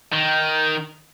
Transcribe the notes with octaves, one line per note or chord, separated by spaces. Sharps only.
D#3